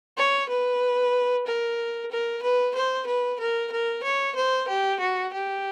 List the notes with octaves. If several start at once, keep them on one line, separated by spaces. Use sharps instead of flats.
C#5
B4
A#4
A#4
B4
C5
B4
A#4
A#4
C#5
C5
G4
F#4
G4